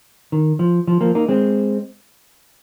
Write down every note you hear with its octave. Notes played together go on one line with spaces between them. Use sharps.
D#3
F3
F3
F3 A#3
A#3 D#4
G#3 C4